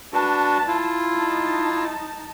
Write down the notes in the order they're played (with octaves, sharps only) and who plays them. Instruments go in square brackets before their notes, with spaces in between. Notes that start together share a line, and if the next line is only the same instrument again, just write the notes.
[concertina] D4 F#4 B4 [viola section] A5
[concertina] E4 F4
[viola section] D#4 A5